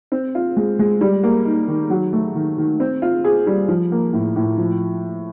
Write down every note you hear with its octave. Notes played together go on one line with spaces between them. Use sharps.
C4
F4
G#3
G#3
G3
A#3
D#4
D#3
F#3
A3
D#3
D#3
C4
F4
G#4
G3
F3
A#3
A2
A2
F3